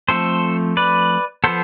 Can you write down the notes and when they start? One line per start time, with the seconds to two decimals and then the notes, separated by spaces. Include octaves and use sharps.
0.08 F3 A3 C4 A4 C5
0.77 B4 D5
1.44 F3 B3 A4 C5